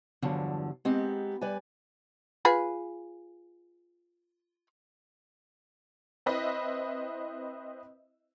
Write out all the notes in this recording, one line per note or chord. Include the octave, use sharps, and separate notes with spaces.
E2 G2 D3 F3 F#3
G#3 B3 C4 D#4 G4
G3 B4 D5 G#5
F4 G#4 B4
C4 E4 B4 C5 D#5 E5